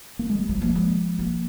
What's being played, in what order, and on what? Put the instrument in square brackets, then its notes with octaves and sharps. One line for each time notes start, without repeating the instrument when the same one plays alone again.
[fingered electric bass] A#3
G#3
G3
[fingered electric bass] F3 [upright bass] G#3
[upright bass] A#3
G#3
A#3